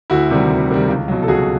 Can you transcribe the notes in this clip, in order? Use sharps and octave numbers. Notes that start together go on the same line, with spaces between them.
D2 E4 F#4
C3 D#3 G3
D2
C3 D#3 G3
C#2
B2 F#3
A4
C#2 F#4 G#4